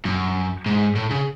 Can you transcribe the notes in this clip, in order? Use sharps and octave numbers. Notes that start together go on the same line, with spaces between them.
F#2
G#2
A2
C#3